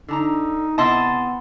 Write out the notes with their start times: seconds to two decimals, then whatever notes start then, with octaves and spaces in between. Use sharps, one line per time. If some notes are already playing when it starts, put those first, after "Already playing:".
0.08 D3 D#4 A5 A#5
0.78 C3 B3 E4 D#5 A5 C6 A6